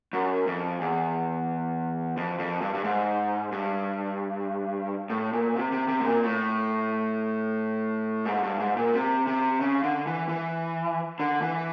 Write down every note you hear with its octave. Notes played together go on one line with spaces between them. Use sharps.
F#2
F2
E2
F2
F2
G2
G2
G#2
G2
A2
A#2
C3
C3
C3
A2
A#2
A2
G#2
G2
G#2
A#2
C3
C3
C#3
D3
E3
E3
D3
E3